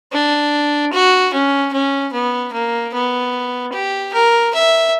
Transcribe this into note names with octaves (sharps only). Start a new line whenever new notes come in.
D4
F#4
C#4
C#4
B3
A#3
B3
G4
A#4
E5